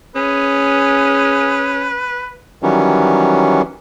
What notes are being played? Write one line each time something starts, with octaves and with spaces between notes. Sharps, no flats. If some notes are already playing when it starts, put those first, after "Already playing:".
C#4 G#4 B4
D#3 E3 F#3 G3 C#4